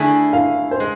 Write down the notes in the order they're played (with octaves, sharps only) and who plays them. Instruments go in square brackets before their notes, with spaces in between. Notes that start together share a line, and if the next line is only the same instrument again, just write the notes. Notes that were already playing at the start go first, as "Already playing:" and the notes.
Already playing: [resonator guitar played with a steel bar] D3 A3 E4 G#4 [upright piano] G#5
[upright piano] F5
C5
[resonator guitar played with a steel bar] G#3